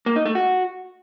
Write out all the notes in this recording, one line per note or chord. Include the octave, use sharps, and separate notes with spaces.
A#3
D#4
A3
F#4